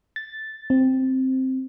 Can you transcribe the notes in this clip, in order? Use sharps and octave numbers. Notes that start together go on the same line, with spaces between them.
A6
C4